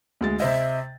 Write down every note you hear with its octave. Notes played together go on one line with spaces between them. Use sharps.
D2 G#3 A6
C3 C5 D#5 E5